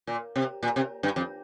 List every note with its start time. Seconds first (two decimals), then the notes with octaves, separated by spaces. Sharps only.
0.07 A#2
0.36 C3
0.63 A#2
0.76 C3
1.03 G2
1.16 F2